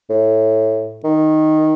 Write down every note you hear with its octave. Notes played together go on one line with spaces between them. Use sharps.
A2
D#3